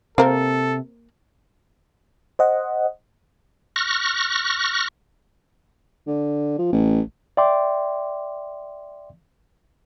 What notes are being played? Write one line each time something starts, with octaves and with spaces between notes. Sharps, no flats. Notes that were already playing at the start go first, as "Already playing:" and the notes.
C3 A#3 C4 A4 A#4 C5
C5 D#5 F#5
C#6 F6 F#6 A#6
D3
F3
A1
D5 E5 G5 C6 D6